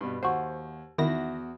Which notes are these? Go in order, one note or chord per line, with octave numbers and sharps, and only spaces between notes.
G2 B2
D#2 F#4 C5
E2 D#3 E4 F#4 A#6